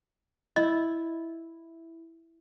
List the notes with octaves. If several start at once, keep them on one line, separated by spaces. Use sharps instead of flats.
E4 D#5